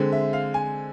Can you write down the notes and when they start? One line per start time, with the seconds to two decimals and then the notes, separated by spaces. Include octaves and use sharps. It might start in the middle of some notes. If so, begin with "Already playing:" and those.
Already playing: D3 G#3 C4
0.12 E5
0.33 F5
0.54 G#5